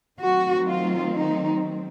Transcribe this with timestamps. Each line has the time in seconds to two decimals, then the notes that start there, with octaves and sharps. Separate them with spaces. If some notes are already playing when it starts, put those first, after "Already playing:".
0.19 D#3 F#3 A3 C4 F#4
0.66 F4
1.14 D#4